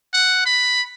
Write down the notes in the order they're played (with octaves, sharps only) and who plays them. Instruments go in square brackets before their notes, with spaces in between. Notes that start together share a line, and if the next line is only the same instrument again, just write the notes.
[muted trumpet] F#5
B5